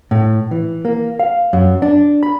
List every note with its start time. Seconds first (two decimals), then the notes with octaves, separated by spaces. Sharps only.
0.11 A2
0.51 E3
0.85 A#3
1.19 F5
1.53 F#2
1.82 D4
2.23 B5